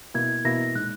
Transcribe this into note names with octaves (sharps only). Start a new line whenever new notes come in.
B2 A#3 E4 G#6
B2 A#3 E4 A#6
A#2 G#3 D#4 F#6